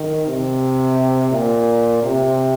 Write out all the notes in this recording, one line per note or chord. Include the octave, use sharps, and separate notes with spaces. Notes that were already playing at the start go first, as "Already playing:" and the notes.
Already playing: D#3
C3
A#2
C3